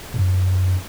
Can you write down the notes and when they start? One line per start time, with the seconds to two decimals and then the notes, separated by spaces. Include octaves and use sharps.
0.14 F#2